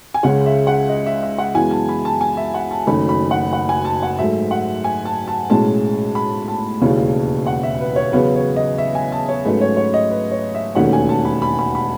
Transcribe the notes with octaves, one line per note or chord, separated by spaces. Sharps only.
G#5
C#2 C#3 G#3 C#4 F#5
E5
F#5
D#5
E5
E5
F#5
F#2 E3 G#3 B3 G#5
A5
B5
A5
G#5
E5
F#5
A5
F#1 F#2 D#3 A3 C#4 B5
B5
F#5
F#5
G#5
A5
F#5
G#2 F#3 A3 E5
F#5
G#5
A5
A5
B1 A2 G#3 C#4 A5
B5
A5
E1 D#2 C#3 E3
F#5
E5
B4
C#5
E2 C#3 F#3 B3 B4
C#5
D#5
E5
G#5
A5
C#5
G#2 F#3 A3 C#4 B4
C#5
C#5
D#5
B4
C#5
E5
E1 D#2 D#3 A3 C#4 F#5
G#5
A5
B5
B5
B5
B5